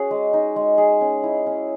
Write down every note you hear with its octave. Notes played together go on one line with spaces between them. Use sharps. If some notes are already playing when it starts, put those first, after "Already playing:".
Already playing: C#4 F#4 G#4
G#3
D#4
G#3
G#4
C#4
E4
C#4